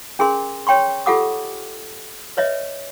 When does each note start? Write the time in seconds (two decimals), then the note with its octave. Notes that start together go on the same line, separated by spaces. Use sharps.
0.19 C#4 G#4 A#4 C6
0.67 C#5 G5 C6 C#6
1.06 F4 G4 A4 F#5 D6 D#6
2.37 B4 C#5 D#5 E5